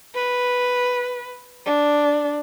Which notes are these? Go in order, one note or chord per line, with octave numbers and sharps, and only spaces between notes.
B4
D4